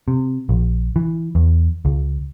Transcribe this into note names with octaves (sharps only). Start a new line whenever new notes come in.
C3
A#1
E3
E2
C#2